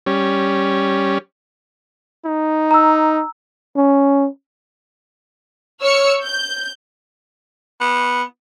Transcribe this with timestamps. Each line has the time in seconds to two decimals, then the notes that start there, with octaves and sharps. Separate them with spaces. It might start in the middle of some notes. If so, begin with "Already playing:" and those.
0.07 G3 C#4
2.26 D#4
2.71 A#5 E6
3.76 C#4
5.81 C#5 E6 F6 C#7
6.23 G6
7.81 B3